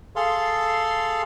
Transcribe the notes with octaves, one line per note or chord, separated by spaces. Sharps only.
G#4 A4 F5 C6